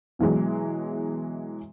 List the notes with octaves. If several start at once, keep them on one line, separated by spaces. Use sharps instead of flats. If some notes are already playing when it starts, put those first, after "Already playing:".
B2 E3 F#3 G#3